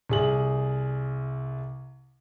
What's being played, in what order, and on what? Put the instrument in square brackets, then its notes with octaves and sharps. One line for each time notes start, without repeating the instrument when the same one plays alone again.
[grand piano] C2 G#4 F#7